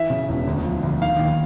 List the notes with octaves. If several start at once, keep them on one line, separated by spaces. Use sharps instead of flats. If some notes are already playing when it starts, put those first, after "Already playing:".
Already playing: E3 E5
C#3
E1
D2
F3
D2
D#3 F5
D#2